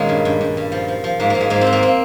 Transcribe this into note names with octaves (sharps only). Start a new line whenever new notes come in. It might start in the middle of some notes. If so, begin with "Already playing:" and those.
Already playing: A#2 D#3 G#3 A#3 C#4 D#4
G2
G2
G2
G2
F3
F3
F3
G#2 A#3
G#2 A#3
G#3
G#2 A#3
C4
G#2
A#3
C4